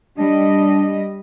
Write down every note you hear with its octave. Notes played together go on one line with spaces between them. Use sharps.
G3 D4 D#5